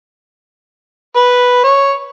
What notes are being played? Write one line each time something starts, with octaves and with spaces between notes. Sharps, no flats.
B4
C#5